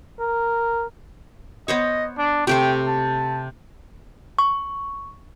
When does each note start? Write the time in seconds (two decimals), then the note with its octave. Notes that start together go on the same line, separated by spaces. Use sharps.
0.20 A#4
1.68 B3 C5 C#5 D#5
2.18 D4
2.47 C3 A3 C5 G5
2.87 A5
4.39 C#6